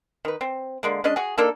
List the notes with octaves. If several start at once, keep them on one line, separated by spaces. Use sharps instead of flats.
D#3 B4
C4
D3 G#3 A#3
G#3 C#4 D4 D#5
F#4 G#4
A#3 D4 D#4 A4